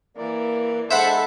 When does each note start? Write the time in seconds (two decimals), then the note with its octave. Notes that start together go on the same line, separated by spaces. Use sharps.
0.17 E3 A#3 A#4 D5
0.91 G#3 D4 A4 C5 E5 F#5 B5 C#7